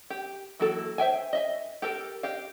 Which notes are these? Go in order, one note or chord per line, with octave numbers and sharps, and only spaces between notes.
G4
E3 F#3 A#3 F#4 A4
C5 E5 G5 G#5
D#5 E5 G#5
G4 A4 A#4
G4 D#5 F5